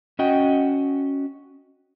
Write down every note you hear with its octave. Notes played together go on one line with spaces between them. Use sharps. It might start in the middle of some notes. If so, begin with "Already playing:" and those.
C#4 F#4 D#5 F#5 G5